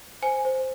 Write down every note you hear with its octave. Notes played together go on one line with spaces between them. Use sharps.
C5 G#5
C5